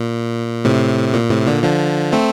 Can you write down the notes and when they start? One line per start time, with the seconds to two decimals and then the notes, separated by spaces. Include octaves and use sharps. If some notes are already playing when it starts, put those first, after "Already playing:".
Already playing: A#2
0.65 A2 C3
1.14 A#2
1.30 A2 C3
1.47 A#2 D3
1.63 D3 F3
2.12 A3 C4